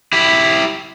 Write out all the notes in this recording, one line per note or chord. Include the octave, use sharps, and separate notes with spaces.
E4 G4